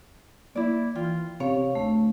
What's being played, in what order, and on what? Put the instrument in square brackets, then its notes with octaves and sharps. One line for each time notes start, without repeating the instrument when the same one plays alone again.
[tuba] A#3 [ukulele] E4 D5
[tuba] E3 [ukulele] F4 [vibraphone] G5
[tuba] C3 [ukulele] C#5 [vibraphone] F5
[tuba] D2 [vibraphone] A3